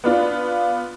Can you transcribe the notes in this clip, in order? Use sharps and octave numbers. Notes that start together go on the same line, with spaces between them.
B3 D4 F4